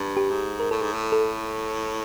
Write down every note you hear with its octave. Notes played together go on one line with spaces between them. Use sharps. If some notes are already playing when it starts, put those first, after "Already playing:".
Already playing: G2
G4
G#2
A#4
A2 A4
G#2
A2
A4